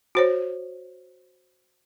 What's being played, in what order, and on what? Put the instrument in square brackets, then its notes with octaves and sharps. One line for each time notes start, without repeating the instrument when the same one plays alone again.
[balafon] F#4 C5 C#5